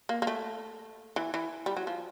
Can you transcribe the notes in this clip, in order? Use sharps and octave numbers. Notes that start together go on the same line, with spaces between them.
A#3
A#3
A3
E3
E3
G3
F#3
F3